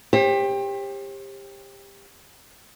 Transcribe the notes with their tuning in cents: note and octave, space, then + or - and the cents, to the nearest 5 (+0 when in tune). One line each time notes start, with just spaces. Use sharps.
G4 +20 C5 +45